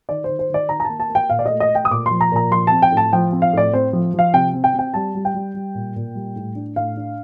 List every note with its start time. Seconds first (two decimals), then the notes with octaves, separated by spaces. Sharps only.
0.09 D#3 D5
0.24 D#3 C5
0.39 C5
0.50 D#3 D5
0.69 D#3 A#5
0.80 A#5
0.85 A#3 A5
1.00 A5
1.10 A#3
1.15 G5
1.30 A#2 F5
1.39 D5
1.46 A3 D#5
1.60 D#5
1.71 A3 G5
1.85 D#6
1.91 A#2 D6
2.06 F3 C6
2.21 A#5
2.32 A#2 A#5
2.51 F3 C6
2.67 C4 A5
2.82 G5
2.92 A2 A5
3.13 F3 G5
3.32 C4
3.42 F5
3.53 A2 D5
3.73 C4 C5
3.93 F3
4.14 F3 F5
4.33 C3 G5
4.53 C4
4.64 G5
4.74 C4 G5
4.94 G3 A5
5.15 G3
5.25 G5
5.34 G3
5.54 G3
5.75 A#2
5.96 A#2
6.15 G3
6.36 A2
6.55 D4
6.76 A2 F5
6.97 D4